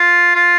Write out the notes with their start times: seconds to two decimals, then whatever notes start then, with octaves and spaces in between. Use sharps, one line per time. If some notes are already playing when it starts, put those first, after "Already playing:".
Already playing: F4
0.35 F4